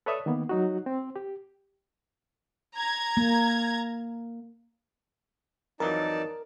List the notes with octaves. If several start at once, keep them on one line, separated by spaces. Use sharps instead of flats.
A4 B4 C#5 D5 E5 D#6
D#3 A#3 B3
F#3 D#4 F#4
C4
G4
A#5 G#6
A#3
F2 E3 F#3 D#4 A#4 D5 A5